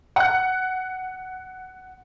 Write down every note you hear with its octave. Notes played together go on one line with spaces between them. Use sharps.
F#5 F#6